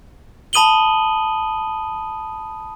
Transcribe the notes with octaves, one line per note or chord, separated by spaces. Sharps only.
A5 B5 D#6 D#7 F#7 G7